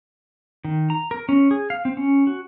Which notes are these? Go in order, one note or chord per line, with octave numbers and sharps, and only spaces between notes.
D#3
A#5
A#4
C#4
G#4
F5
C4
C#4
F#4